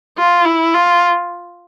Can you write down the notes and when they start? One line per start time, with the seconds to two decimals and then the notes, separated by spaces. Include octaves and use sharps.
0.18 F4
0.45 E4
0.74 F4